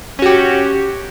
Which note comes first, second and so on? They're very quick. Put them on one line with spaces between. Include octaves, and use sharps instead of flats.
C#4 F#4 G4